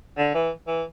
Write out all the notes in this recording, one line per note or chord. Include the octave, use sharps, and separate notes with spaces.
D3
E3
E3